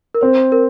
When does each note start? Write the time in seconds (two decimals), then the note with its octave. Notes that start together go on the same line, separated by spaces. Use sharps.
0.15 A#4
0.21 C4 C5
0.52 A#4